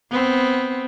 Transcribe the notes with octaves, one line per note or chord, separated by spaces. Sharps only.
B3 C4